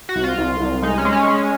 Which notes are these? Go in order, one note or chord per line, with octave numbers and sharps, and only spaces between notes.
F#4
C2
F4
C2
C2
G#3 D#4
C#4
G#3
C#4
G#3